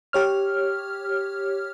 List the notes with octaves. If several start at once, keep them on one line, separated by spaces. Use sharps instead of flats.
G4 C#5 F6